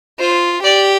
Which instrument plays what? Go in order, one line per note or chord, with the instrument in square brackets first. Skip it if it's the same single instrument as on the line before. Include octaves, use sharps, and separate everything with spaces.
[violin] F4 [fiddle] C5
[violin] G4 [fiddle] D5